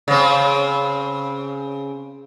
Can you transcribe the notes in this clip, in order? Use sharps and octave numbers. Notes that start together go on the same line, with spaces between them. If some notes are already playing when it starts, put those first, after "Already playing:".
C#3 C4